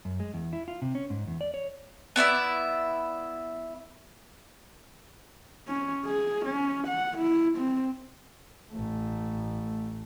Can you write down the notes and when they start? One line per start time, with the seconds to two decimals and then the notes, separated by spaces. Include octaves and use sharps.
0.05 F#2
0.20 G#3
0.34 E2
0.53 E4
0.68 F4
0.82 C3
0.95 C#4
1.10 G#2
1.27 E2
1.41 D5
1.54 C#5
2.16 B3 E4 D5 E5
5.68 C#4
6.06 G#4
6.46 C#4
6.87 F#5
7.18 E4
7.57 C4
8.72 A1 A3